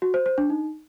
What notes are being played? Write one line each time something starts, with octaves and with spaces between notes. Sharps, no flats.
F#4
C5
C5
D4
D#4